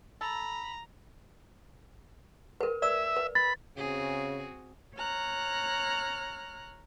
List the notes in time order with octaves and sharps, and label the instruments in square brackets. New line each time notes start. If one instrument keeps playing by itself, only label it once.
[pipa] A4 [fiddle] A#5 [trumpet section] B5
[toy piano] A#4 B4
[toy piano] D5 E6 [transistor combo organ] E5
[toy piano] B4
[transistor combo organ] B5 [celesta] A6
[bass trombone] C#3 [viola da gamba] C4 F#4 G#4
[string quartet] C#5 A#5 F6 F#6